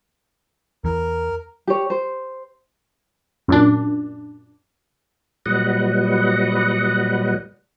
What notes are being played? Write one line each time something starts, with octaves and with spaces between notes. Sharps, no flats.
E2 E3 A#4
G4 C#5
C5
F#2 A#2 D4
A#2 F#3 G3 B4 D#5 F#5